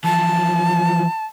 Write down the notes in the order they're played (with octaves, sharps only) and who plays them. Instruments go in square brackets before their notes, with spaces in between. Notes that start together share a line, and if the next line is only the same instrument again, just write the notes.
[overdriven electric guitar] E3 F3 [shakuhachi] A5